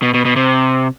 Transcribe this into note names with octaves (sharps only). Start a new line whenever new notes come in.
B2
B2
B2
C3